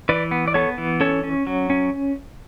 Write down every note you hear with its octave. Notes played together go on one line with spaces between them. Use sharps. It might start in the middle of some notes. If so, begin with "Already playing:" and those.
E3 B4 D5
B3
D5
B3 A4 C#5
E3
C#4 A4 C#5
C#4
F#3
C#4